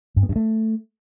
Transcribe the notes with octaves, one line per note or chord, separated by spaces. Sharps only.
G2
B3
G2
A3